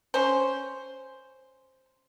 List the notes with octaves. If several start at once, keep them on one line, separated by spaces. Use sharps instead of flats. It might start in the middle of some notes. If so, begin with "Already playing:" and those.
C#4 C5